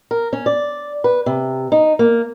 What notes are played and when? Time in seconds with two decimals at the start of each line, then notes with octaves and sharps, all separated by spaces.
0.11 A#4
0.33 C#4
0.46 D5
1.04 B4
1.26 C3
1.72 D#4
1.99 A#3